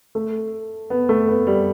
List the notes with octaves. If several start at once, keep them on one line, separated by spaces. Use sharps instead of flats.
A3
B3
A3
B3
G3